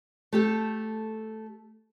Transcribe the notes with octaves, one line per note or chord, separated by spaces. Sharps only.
A3 G4 A4